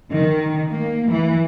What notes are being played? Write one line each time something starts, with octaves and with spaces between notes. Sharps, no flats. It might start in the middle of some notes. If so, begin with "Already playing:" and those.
D#3
A#3
E3